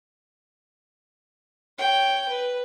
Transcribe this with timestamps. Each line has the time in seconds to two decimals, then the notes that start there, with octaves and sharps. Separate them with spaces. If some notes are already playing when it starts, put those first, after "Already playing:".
1.78 C#5 G5
2.29 B4